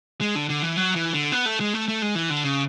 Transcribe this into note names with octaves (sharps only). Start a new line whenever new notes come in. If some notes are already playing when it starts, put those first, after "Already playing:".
G#3
D3
D3
E3
F#3
E3
D3
B3
A3
G#3
A3
A3
G#3
E3
D3
C#3